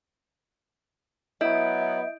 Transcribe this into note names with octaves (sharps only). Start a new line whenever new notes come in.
F#3 B3 E4 D#5 E5 G6 D7